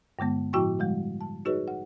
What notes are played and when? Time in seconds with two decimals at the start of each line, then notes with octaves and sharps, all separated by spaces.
0.19 G2 D3 G#3 B3
0.53 A2 F3 E4 F#4 G5 C#6
0.79 D3 F3 G3 G#3
1.21 A5
1.45 D#4 F#4 G#4 B4 C#5 D#5
1.68 F#5